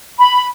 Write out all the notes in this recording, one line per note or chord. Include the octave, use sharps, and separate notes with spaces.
B5